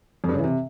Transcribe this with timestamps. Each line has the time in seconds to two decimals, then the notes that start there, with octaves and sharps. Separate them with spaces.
0.24 F2
0.29 G2
0.34 C#3
0.39 E3
0.44 C3